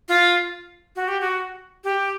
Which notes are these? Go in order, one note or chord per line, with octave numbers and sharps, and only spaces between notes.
F4
F#4
G4
F#4
G4